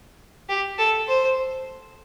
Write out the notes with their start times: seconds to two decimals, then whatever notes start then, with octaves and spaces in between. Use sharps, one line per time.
0.49 G4
0.78 A4
1.08 C5